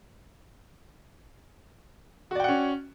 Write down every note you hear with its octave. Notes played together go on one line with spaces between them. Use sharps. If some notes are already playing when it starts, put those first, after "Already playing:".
C#4 F#4 D5 F#5 G5